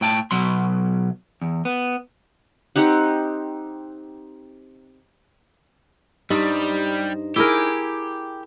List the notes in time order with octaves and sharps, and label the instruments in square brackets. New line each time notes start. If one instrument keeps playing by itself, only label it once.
[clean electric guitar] A2 G5 A5
B2 F#3 C6
E2
B3
[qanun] C4 D#4 G4 F#5
[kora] G2 [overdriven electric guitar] G3 [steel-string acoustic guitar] D#4 C5
[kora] E4 G#4 A#4 [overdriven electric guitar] G4